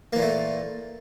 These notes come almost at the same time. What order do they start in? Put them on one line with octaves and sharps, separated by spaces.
A#3 E3 A#2 A3